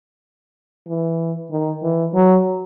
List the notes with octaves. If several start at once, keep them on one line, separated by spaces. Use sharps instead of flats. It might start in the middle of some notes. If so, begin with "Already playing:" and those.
E3
D#3
E3
F#3